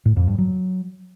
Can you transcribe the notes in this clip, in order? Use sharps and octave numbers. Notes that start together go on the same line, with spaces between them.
A2
F2
G2
F#3